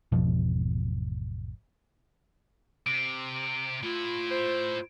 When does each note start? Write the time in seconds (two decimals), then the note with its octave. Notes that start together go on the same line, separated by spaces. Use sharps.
0.12 G#1 E2 B2 F3
2.86 C3 D7
3.83 A2 E4 F4
4.31 C5